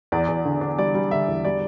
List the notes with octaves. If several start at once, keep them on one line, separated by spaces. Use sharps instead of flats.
E2 D5
E2
D3
D4
G3 D5
G3
D3 E5
E2
G3 D5